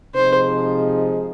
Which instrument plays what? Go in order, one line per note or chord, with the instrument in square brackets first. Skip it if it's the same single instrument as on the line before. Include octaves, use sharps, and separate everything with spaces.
[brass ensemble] C3 F3 G#3 D#4 G#4 [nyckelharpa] C5